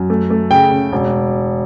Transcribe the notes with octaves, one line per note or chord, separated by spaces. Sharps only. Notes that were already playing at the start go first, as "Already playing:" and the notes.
Already playing: F#2
A3
A3
C#3 G5
C#3
E1